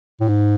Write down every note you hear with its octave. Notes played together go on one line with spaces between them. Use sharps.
A2
G#2